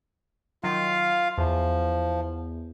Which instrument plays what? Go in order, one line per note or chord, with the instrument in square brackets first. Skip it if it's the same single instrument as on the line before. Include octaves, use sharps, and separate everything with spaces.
[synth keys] D#3 F#3 [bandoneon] F4 F5
[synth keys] E2 [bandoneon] F3